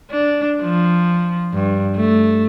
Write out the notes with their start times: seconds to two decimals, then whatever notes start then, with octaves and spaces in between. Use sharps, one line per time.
0.11 D4
0.62 F3
1.54 G2
1.96 A3